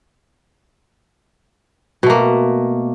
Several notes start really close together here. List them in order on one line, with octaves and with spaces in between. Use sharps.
B2 A3 A#3